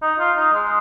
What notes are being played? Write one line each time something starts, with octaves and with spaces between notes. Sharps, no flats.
D#4
F4
D#4
G#3